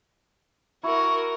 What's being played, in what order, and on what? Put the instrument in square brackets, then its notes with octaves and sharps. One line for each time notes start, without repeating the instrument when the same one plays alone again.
[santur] E4 [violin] F#4 A#4 [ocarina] C#6